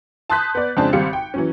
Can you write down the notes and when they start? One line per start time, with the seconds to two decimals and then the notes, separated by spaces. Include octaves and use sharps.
0.30 A5 C6 D#6 F#6 G6 B6
0.55 B3 D5
0.77 F2 C#3 G#3 C4 D4 A5
0.93 G#1 G3 C4 F5 C#7
1.13 G5
1.34 E3 F#3 C#4